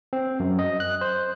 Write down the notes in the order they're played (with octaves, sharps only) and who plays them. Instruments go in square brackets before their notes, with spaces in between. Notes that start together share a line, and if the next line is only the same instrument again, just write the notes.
[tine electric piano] C4
F#2
D#5
F#6
C5